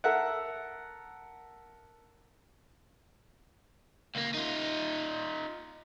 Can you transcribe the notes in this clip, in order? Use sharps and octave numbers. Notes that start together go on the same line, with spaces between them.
A4 A#4 E5 F#5
C#2 A#3
D#4 F4